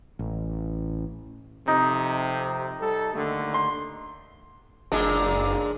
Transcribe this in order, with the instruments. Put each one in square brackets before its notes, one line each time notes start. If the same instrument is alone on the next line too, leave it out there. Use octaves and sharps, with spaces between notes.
[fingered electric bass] A1
[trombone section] F2 C3 [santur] D#4
[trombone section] G3 A4
D#2 D3 A3
[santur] C6
[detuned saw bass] F#1 [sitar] A#2 G#3 D4